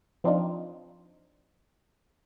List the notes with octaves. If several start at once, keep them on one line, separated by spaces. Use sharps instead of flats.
F3 C4 D4 D#4 F4